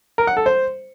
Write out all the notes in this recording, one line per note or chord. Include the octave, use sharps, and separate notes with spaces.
A#4
F#5
A4
C5